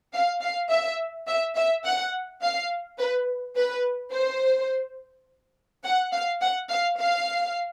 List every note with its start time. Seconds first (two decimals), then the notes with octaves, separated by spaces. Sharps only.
0.14 F5
0.42 F5
0.70 E5
1.28 E5
1.55 E5
1.85 F#5
2.42 F5
2.99 B4
3.56 B4
4.13 C5
5.84 F#5
6.12 F5
6.41 F#5
6.69 F5
6.99 F5